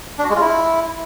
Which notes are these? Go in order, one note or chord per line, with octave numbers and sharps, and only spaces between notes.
D4
F#4
G#3
F4
E4